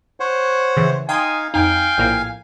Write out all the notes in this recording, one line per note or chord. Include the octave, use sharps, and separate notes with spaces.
C5 C#5 F#5
C#3 E3
D#4 F5 G5 G#5 C6 D#6
F2 D#4 F5 G5 G#5
A#1 A2 A#3